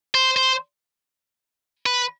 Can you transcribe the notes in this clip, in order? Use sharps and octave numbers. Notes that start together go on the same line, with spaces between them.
C5
C5
B4